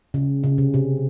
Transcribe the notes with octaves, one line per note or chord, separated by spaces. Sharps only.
C#3
C#3
C3
C3